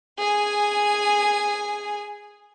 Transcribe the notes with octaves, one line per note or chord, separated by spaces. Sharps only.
G#4 G#5